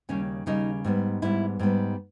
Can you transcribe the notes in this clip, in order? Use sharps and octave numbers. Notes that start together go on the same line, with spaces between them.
D#2 C#3 G3 C#4
D#2 C#3 G3 D#4
G#2 G3 B3
G#2 G3 B3 E4
G#2 G3 B3